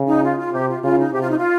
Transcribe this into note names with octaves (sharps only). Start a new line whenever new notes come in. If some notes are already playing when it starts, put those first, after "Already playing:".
Already playing: C#3
D#4
F4
F4
C3 G4
F4
C#3 F4
D#4
C3 G4
F4
D#4
F4